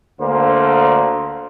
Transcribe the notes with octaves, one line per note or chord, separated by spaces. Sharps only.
D2 D3 A#3 C5